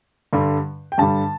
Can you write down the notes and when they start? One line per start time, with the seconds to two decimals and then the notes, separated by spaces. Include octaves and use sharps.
0.33 G2 D3 G3
0.92 G5
0.98 G2 D3 G3 A5